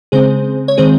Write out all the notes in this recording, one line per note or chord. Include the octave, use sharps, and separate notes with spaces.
C#3 G#3 C4 G#4 C5
C#5
D#3 G#3 C4 G#4 C5